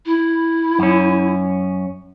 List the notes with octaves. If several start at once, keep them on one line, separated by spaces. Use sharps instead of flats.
E4
F#2 C#4